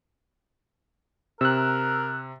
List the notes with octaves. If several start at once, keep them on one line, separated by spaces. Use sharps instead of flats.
C3 A#4 E6 F#6